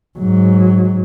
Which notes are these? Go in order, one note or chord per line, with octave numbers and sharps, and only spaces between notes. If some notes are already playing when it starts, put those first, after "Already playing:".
G#2 F#3